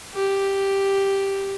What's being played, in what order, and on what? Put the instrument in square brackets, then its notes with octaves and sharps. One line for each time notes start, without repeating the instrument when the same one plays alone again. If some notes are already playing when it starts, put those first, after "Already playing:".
[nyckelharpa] G4